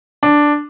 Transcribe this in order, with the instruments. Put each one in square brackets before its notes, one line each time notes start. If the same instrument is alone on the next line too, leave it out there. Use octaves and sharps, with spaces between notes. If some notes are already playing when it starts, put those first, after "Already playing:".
[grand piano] D4